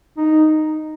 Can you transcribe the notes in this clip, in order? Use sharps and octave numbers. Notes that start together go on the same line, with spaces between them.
D#4